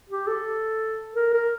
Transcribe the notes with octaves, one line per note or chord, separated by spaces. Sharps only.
G4
A4
A#4
A#4